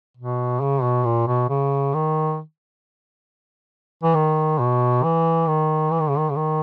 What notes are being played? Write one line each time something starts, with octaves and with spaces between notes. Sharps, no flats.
B2
C#3
B2
A#2
B2
C#3
D#3
E3
D#3
B2
E3
D#3
E3
D#3
C#3
D#3
C#3
D#3